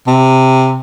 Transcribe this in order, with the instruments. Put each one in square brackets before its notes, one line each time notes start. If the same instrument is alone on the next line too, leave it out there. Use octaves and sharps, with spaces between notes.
[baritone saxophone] C3